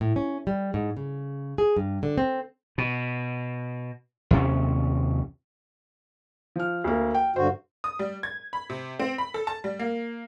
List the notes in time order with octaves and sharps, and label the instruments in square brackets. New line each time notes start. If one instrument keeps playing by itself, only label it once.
[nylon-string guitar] A2
C#4
G3
G#2
C#3
G#4
G2
D3
C4
[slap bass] B2
D#2 C3 C#4
[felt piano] F3 F6
D2 A#3
G5
[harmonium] G2 D3 F#4 [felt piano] C5
[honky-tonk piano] D#6
G3
G#6
B5
C3
C4
B5
A4
A5
G3
A#3